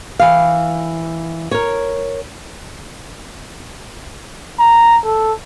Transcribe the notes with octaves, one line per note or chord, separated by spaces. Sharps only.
E3 F5
A#4 C#5
A#5
A4